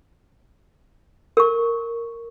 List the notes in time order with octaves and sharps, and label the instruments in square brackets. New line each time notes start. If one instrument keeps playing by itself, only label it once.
[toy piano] A#4 C#6